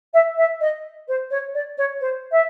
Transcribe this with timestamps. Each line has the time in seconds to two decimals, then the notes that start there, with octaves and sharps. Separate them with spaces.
0.14 E5
0.37 E5
0.60 D#5
1.08 C5
1.30 C#5
1.54 D5
1.77 C#5
2.00 C5
2.31 E5